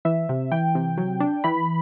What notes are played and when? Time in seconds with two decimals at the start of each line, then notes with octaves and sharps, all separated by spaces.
0.05 E3 E5
0.29 C3
0.52 E3 G5
0.75 C3
0.98 F#3
1.20 D4
1.44 E3 B5